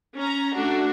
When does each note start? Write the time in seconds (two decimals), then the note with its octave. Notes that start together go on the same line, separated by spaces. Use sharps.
0.16 C#4 A#5
0.56 A3 D4 F#4